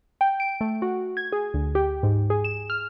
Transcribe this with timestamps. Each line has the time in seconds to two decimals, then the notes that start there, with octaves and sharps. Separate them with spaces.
0.21 G5
0.40 D7
0.61 A3
0.82 F#4
1.17 G#6
1.33 G#4
1.54 D2
1.75 G4
2.03 G#2
2.30 G#4
2.44 E7
2.70 F6